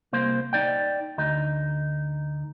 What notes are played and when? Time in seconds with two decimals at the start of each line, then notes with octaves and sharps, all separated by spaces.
0.13 C2 A#3 C5
0.53 D#4 D5 G5
1.18 D2 D#4